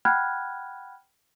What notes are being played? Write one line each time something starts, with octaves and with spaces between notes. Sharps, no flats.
F#5 G5 B5 F6 F#6 G#6